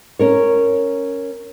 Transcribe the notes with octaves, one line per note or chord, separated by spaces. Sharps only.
C#4 A#4 C#5